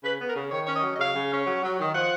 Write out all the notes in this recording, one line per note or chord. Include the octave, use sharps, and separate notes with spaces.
C#3 B4
B3
A#4
C#3
D#3 C#5
C#4 C#5
D#5
F#3
D#5
C#3 F5
C#3
C#4
F#3
F#3
D#3
F3 F#5